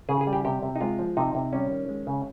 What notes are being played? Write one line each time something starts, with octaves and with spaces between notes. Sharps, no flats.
C#3 G#4
G#4
G3
G4
C3 G4
C3
D#4
G#3 F4
F3
C3 D#4
C3
G3 C#4
D#3
G#3
C#3